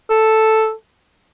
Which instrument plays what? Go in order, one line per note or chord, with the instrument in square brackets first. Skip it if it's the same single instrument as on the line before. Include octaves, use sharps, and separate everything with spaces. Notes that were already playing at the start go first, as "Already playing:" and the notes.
[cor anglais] A4